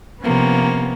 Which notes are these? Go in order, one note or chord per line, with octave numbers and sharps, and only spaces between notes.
C3 F3 A#3 B3 C#4